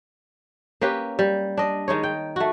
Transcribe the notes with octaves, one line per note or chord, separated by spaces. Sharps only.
A#3 C#4 G4 B4
G3
D4 D#5
D#3 G#3 D#4 C#5
G5
A3 F#4